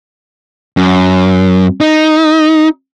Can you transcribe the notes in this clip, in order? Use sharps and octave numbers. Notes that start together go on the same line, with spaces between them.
F#2
D#4